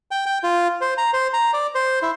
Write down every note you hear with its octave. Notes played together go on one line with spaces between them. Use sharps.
G5
G5
F4
C5
A#5
C5
A#5
D5
C5
E4